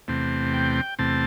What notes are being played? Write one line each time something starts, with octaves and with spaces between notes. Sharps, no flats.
E2 C3 A3 C4
G5
E2 C3 A3 C4 A5